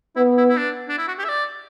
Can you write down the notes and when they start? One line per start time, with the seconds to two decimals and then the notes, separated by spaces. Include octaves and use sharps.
0.16 B3 E4
0.37 E4
0.49 E4
0.57 D4
0.89 D4
0.98 E4
1.08 F#4
1.19 G4
1.24 E5
1.29 D5